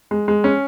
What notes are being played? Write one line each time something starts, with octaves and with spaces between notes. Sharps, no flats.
G#3
G#3
C#4